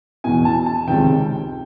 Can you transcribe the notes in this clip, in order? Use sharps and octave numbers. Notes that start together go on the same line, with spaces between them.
E2 B2 G#5
A5
A5
C#2 C3 D#3 G5